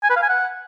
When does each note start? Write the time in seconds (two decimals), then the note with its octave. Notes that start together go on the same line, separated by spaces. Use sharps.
0.03 G#5
0.10 B4
0.16 F5
0.23 G#5
0.29 F#5